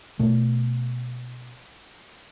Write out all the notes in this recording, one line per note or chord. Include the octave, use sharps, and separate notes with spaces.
B2 A3